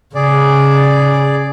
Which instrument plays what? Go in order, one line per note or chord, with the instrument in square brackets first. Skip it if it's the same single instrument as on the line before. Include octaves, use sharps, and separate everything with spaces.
[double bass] C#3 [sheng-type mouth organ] G#4 D5